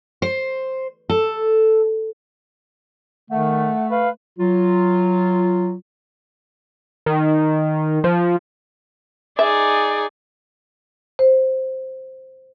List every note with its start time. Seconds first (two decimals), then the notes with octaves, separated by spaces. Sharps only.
0.22 C5
1.09 A4
3.31 D#3 A3 F#5
3.91 B4 F5
4.39 F#3 F4
7.06 D#3
8.04 F3
9.39 D#4 G#4 D5 E5
11.19 C5